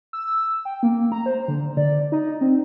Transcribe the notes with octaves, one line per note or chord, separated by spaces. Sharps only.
E6
G5
A#3
A#5
C5
D3
D5
D#4
C4